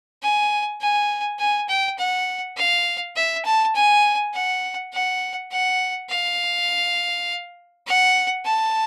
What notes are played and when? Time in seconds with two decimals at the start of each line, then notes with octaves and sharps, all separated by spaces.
0.22 G#5
0.81 G#5
1.39 G#5
1.68 G5
1.98 F#5
2.57 F5
3.16 E5
3.45 A5
3.75 G#5
4.34 F#5
4.93 F#5
5.51 F#5
6.10 F5
7.87 F#5
8.45 A5